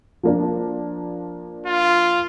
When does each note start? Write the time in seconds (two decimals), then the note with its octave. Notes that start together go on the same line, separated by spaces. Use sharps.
0.23 F3 A#3 D4
1.67 F4